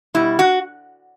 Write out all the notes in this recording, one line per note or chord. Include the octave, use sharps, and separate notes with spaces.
B2 G3 E4
F#4